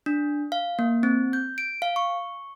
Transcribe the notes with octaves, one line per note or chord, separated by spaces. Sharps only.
D4
F5
A#3
C4
G6
D7
F5
C#6